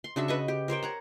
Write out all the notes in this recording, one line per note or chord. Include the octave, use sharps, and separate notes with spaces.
C6
C#3 D4 F#4 E5
B4 D#5 C#6
G4
A#4 C5 C#5 G5
C#5 F#5 A#5